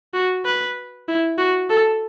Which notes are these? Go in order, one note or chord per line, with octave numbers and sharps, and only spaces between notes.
F#4
B4
E4
F#4
A4